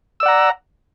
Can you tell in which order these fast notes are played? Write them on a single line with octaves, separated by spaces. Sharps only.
E6 D5 F#5 A#5